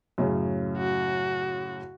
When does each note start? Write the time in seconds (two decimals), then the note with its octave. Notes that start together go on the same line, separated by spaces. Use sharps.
0.18 F#2 A2 C#3
0.77 F#4